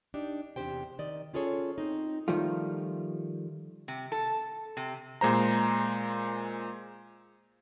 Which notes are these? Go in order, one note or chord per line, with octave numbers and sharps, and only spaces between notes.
D4 D#4 G4
E2 C3 G4 C5 G5
D#3 D5 D#5
C#4 F4 G#4 A4 C#5
C4 D#4
D#3 F3 G3 A3 F4
C3
A4
C3
A#2 G#3 C5 A#5